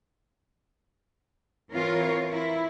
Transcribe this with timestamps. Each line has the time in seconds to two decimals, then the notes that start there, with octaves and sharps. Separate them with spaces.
1.72 E3 C4 F4 A#4 C#5
2.30 E4